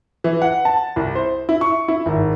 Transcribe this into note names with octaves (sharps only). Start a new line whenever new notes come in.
E3
F#5
A5
C2
C5
E4
C#6
E4
G#1